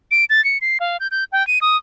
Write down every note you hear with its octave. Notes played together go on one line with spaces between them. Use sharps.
D7
A6
C#7
C7
F5
G6
G6
G5
D#7
D#6